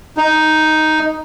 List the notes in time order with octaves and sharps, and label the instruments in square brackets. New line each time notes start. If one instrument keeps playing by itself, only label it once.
[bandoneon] D#4